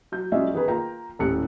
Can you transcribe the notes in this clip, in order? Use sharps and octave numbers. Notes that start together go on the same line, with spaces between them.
F#3 G6
F#3 G#3 C#4 F4 D5 E5
D#3 B3 G#4 B4
A#3 F4 G5 A#5
D#1 A2 G4 F#6 C#7